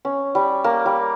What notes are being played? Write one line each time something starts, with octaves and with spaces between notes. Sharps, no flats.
C#4
G3
A#3
G3